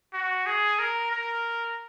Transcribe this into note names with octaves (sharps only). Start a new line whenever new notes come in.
F#4
G#4
A#4
A#4